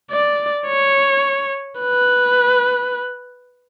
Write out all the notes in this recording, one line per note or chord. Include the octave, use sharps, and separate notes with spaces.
D5
C#5
B4